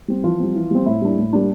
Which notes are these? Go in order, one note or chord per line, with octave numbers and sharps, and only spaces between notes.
G3 C4
E3 F3 F4
G3 C4
E3
G3 C4
A2 E4
G3 A#3 D4
A2
G3 A#3 D4